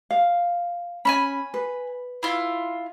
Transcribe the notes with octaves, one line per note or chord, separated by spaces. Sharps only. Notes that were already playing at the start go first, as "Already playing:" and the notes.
F5
C#4 G#5 A5 B5
B4
E4 F4